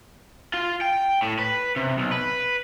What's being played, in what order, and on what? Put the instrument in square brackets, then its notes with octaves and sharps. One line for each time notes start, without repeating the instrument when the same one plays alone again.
[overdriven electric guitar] F4
G5
A2
B4
C3
B1
B4